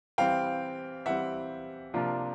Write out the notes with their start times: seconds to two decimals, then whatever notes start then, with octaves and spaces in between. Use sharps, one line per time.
0.18 E3 G3 C4 F5 G5
1.06 E3 G3 C4 E5 F#5
1.94 C3 F3 A#3 D4 F4